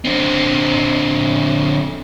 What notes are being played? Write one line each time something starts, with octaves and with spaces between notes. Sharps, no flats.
D3 C4